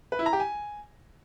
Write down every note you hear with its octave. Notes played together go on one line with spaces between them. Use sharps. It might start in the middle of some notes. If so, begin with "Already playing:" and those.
B4
E4
A#5
G4
G#5